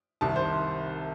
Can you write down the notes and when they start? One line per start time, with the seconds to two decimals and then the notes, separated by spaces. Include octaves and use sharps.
0.21 C2 C3 D#3 A5
0.36 C5